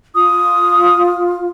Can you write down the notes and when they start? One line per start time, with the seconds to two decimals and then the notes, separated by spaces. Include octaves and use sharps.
0.15 F4 D#6